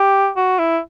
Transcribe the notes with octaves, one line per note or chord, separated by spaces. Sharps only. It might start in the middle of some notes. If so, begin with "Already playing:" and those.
Already playing: G4
F#4
E4